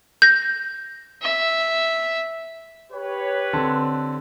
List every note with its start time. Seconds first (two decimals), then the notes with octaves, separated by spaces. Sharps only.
0.22 G6 A#6
1.22 E5
2.92 G4 B4 C#5
3.53 D3 C4 A5